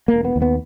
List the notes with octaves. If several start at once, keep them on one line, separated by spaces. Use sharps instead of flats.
A#3
E1
B3
D#2
B3